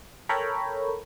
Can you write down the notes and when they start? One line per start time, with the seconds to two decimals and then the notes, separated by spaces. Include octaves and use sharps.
0.29 A4 A#4 C#5 G5 A#5 B5